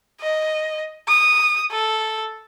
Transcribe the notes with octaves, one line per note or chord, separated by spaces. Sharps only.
D#5
D#6
A4